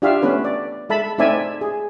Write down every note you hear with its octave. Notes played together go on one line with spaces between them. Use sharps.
D4 F4 G4 E5 F5
A3 B3 C#4 B4
D5
G#3 A4 E5 A5 B5
A3 C4 D#4 D5 E5 G#5
G#4